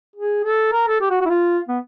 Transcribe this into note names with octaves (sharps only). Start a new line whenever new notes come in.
G#4
A4
A#4
A4
G4
F#4
F#4
E4
F4
B3